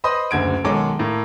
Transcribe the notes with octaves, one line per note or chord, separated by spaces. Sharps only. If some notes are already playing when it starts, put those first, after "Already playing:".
B4 C5 D#5 B5 C6 D#6
F#1 D2 G#6 D7
B1 D#3 G#3 A4 C#5 D6
A2 A#3